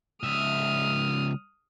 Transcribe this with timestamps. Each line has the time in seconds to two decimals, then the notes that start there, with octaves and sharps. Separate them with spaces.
0.23 C#2 E5 D#6 F6